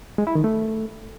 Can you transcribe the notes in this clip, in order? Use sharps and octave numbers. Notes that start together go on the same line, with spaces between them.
G#3
E4
D#3
A3